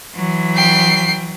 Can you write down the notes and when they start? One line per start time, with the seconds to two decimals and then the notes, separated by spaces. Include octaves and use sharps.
0.15 E3 F#3
0.55 G5 C7